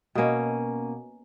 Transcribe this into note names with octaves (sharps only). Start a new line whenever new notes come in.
B2 A#3 C#4